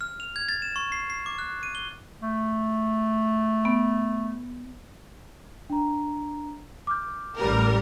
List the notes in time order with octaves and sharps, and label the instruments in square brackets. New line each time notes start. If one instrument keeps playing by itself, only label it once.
[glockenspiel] F6
F7
G#6
A6
E7
C#6
C7
C7
D6
F#6
D#7
G7
[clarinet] A3
[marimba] B3
[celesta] D4 A#5
D6 F6 G6
[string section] A1 G3 A#4